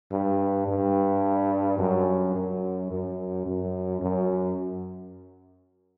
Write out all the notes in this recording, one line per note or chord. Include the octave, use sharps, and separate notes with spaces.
G2
G2
F#2
F#2
F#2
F#2
F#2